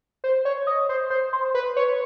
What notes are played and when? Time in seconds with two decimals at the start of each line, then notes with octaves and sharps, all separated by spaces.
0.24 C5
0.45 C#5
0.67 D#5
0.89 C5
1.10 C5
1.33 C5
1.55 B4
1.77 C#5